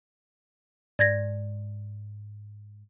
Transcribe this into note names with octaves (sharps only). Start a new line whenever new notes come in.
G#2 D5 G#6 A#6